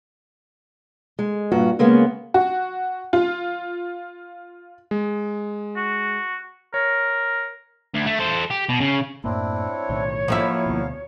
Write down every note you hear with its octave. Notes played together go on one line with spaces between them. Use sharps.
G#3
G2 A#2 F#4
C#3 G#3 A#3 B3 C#4
F#4
F4
G#3
F#4
A#4 C#5
D2
A3
A4 C5
G4
B2
C#3
F#2 A2 A#3 C4 D4 E4
C#5
B1 A2 D#3
F3 F#3 A#3 E4 F5
D2 B2